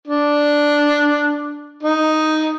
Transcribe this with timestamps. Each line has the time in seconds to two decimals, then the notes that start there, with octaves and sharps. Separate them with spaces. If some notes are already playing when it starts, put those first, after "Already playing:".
0.07 D4
1.83 D#4